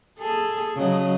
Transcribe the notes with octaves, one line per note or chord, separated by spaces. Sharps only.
G#4 A4
C#3 F#3 D#5